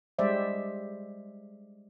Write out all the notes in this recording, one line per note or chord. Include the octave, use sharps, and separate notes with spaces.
G3 G#3 C5 D5 E5